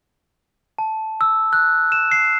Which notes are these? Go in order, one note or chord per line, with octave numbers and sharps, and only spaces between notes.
A5
E6
F#6
E7
C7